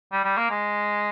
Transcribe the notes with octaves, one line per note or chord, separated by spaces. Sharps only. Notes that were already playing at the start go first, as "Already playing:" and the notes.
G3
G3
A#3
G#3